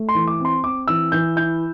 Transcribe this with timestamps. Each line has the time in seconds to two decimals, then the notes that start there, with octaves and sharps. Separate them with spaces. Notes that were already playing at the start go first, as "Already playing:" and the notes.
Already playing: A3
0.09 C6
0.15 E3
0.27 D6
0.39 C4
0.45 C6
0.64 C4 D6
0.88 E3 E6
1.12 E3 G6
1.36 E4 G6